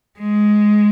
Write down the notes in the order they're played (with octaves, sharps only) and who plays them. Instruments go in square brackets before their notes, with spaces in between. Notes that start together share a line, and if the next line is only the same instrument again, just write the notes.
[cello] G#3